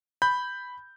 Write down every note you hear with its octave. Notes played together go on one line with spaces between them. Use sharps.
B5 G6